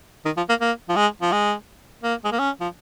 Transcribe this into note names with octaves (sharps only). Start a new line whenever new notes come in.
D#3
F3
A#3
A#3
F3
G#3
F3
G#3
A#3
G#3
A#3
C#4
F3